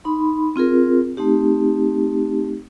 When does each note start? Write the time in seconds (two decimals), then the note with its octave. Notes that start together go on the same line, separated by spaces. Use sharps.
0.04 D#4 B5 C6
0.56 C4 F4 G#4 A#4
1.17 A3 C4 D#4 G4